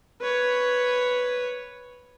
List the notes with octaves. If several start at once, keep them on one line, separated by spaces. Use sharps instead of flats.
B4 C#5